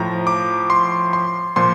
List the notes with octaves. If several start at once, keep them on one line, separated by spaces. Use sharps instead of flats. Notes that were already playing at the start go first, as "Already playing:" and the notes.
Already playing: A2 F3 A#5
D6
C6
C6
A#2 F3 C6